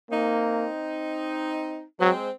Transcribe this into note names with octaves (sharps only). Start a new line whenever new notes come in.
A#3 C4 D#4
F#3 G#3 C4